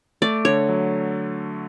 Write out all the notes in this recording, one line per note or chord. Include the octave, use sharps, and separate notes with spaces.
A3 D5
D3 C#5
F#3